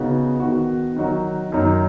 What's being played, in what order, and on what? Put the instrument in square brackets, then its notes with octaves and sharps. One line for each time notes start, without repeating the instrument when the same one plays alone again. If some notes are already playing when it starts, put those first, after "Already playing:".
Already playing: [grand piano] C#3 B3 D#4 F#4
D#3 B3 F#4
D#3 F#3 D#4 F#4
F#2 D#3 F#3 D#4